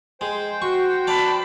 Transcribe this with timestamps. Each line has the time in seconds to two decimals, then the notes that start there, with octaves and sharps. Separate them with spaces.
0.21 G#3 C5 G5
0.62 F#4 C#6
1.07 D5 F5 A5 B5